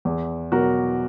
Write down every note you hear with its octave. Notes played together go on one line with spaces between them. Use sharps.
E2
B2 F#3 F#4 A#4